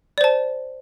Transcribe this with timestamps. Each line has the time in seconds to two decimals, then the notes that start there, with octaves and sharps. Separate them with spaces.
0.18 D5
0.21 C5
0.24 A5